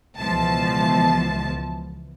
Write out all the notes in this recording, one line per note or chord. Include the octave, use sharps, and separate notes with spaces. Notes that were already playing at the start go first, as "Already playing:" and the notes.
C#2 B2 E3 F3 A5